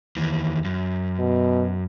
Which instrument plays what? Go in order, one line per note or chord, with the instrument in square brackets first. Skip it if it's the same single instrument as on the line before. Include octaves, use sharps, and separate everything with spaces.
[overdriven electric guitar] D#2 E3
F#2
[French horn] B2